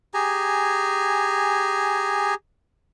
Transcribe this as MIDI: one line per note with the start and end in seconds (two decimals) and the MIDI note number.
0.14 2.34 67
0.14 2.34 68
0.14 2.34 80
0.14 2.34 82